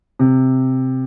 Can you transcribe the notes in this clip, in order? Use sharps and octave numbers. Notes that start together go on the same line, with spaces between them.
C3